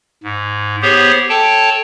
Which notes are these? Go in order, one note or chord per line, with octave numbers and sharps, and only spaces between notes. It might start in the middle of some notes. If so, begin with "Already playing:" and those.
G#2
B3 G4 G#4 C5 C#5
A4 C#5 G5 A5